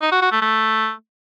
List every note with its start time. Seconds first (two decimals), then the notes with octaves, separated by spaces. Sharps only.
0.02 D#4
0.12 F#4
0.22 F#4
0.32 A3
0.42 A3